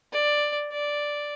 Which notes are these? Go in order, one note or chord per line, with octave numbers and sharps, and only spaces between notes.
D5
D5